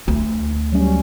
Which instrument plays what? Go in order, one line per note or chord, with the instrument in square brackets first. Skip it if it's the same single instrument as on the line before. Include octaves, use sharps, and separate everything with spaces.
[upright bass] D2
[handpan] F#3 G3 C#4